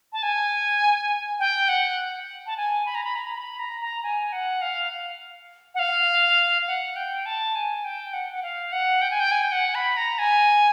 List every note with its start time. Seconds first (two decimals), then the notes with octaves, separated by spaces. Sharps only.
0.13 A5
0.23 G#5
1.39 G5
1.69 F#5
2.47 A5
2.57 G#5
2.86 B5
2.95 A#5
3.04 B5
3.16 A#5
3.31 A#5
3.37 B5
3.59 A#5
3.81 A#5
4.03 G#5
4.33 F#5
4.62 F5
5.75 F#5
5.79 F5
6.67 F#5
6.96 G5
7.26 A5
7.55 G#5
7.84 G5
8.13 F#5
8.33 F#5
8.43 F5
8.72 F#5
9.02 G5
9.11 G#5
9.20 G5
9.31 G#5
9.43 G5
9.52 F#5
9.75 B5
9.97 A#5
10.19 G#5